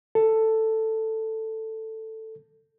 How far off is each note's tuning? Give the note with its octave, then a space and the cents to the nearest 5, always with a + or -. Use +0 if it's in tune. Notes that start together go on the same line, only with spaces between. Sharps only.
A4 +10